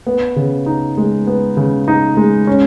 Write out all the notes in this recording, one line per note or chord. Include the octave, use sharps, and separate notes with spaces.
B3
C#3
D#4
G#3
B3
C#3
D#4
G#3
C#4